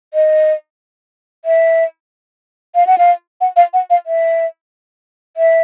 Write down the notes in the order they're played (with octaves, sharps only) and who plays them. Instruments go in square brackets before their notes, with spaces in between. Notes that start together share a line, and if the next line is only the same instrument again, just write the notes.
[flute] D#5
E5
F5
F#5
F5
F#5
F5
F#5
F5
E5
E5